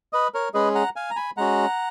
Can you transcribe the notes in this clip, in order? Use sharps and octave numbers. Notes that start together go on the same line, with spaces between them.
B4 D#5
A#4 C#5
G#3 C#4 G#4 B4 D#5
F#5 A#5
F5 G#5
A#5
G#5 B5
G#3 C#4 F#4 F#5 A#5